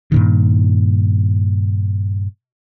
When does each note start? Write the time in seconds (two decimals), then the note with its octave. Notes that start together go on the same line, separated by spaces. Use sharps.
0.12 G2 A#2 D#3